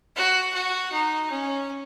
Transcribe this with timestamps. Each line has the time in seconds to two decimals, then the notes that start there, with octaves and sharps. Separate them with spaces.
0.16 F#4
0.54 F#4
0.92 D#4
1.31 C#4